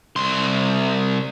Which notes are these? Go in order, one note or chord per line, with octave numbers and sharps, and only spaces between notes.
C2 C6